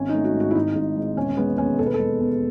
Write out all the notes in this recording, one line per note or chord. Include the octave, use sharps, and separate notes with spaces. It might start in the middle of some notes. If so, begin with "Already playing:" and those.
Already playing: G#1 C#4
D#4
A3
F#4
G#2
F#4
E4
G#1 D#4
G#1
G#2
E1 C#4
G#3 B3
D#2 C#4
E1 A4
B4
G#3 A4
E2